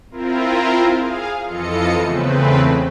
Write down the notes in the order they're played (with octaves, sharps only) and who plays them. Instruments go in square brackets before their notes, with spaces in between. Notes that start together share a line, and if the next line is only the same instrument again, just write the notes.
[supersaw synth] C4 E4 F4 A#4
G#4 F5
F2 E3 F4 A4 D#5 C#7
E2 C#3 A3 C4 B4